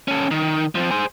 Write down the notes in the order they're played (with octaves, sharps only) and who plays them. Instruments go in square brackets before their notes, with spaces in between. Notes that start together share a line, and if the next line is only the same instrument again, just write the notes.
[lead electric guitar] C#4 A4
D#3
F3 C4
G#4 C5